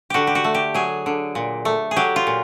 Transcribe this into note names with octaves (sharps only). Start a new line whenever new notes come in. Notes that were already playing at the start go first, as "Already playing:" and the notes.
D3 F#4 G4
G4
F#4
A3
G4
F#3 G#4
D3
A#2
A3
G#4
F#3 G4
F4
A#2